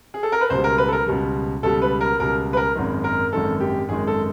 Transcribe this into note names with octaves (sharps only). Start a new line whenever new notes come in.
G#4
A4
A#4
B4
C#2 B2 G3 C5
A#4
B4
A4
A#4
C#2 B2 G3
C#2 B2 G3 A4
B4
A#4
C#2 B2 G3 A#4
B4
A#4
G#1 F#2 D#3 G#3
A#4
G#1 F#2 D#3 G#3 A4
G4
G#1 F#2 D#3 G#3 G#4
A4